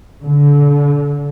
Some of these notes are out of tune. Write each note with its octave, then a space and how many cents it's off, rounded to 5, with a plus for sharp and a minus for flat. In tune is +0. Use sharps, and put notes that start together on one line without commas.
D3 -30